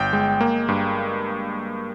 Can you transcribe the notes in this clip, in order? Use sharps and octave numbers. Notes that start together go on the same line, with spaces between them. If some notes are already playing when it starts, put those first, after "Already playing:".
Already playing: G1 G5 G6
G#3
A#3
G2